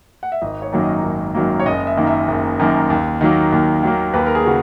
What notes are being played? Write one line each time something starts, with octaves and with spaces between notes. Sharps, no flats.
F#5
E5
G#1 D#5
C#5
F#2 D#3 F#3 A#3
D#5
G#1
F#2 D#3 F#3 A#3
C#5
F#1 D#5
E5
F#2 D#3 A#3
E5
F#1
F#2 D#3 A#3
D#2
D#3 F#3 A#3
D#2
D#3 F#3 A#3
D#2 B4
A#4
G#4
C#3 F#4